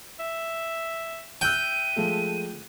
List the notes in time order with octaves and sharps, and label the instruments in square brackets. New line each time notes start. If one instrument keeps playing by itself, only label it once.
[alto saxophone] E5
[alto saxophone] E5 [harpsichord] G5 [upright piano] E6 F#6 G6 [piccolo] D#7
[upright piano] F3 G#3 A3